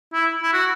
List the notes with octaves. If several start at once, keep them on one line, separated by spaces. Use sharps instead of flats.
E4
E4
F#4